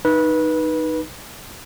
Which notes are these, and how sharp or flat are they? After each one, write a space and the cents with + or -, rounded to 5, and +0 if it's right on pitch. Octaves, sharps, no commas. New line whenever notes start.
D#4 -5 B4 -20